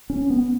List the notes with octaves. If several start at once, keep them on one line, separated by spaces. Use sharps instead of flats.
C#4
B3